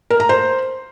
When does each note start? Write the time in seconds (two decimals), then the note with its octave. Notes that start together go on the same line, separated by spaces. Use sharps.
0.10 A#4
0.20 A#5
0.29 C5